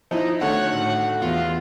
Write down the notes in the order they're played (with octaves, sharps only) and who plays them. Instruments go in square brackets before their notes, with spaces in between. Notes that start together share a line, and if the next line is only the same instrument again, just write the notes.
[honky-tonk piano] F3 E4 [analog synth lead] D#4
[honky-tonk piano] D3 D#3 A3 [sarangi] F#4 [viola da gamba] C#5 [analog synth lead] F#5
[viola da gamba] A2
[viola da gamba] E2 [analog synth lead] F4